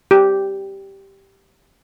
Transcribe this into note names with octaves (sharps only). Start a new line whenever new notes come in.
G4